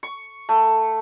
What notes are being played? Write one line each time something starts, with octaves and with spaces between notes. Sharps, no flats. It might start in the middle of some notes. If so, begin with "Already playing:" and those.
C#6
A3